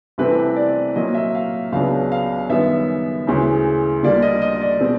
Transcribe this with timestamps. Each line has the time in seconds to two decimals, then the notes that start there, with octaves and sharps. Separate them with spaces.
0.18 C2 C3 E3 A3 C4 B4
0.56 D5
0.96 A#2 F#3 A#3 D#5
1.15 E5
1.35 F5
1.72 C#2 C#3 F#3 B3 D4 F5
2.12 F5
2.49 F#2 D#3 G3 B3 E5
3.27 D2 C#3 E3 G#3
4.03 D2 D3 G3 A#3 D5
4.22 D#5
4.42 D#5
4.62 D5
4.80 B2 G#3 C4